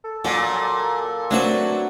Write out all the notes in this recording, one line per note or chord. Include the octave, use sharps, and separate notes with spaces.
A4
A#2 F#3
F#3 A3 C4 D4 F#4 B4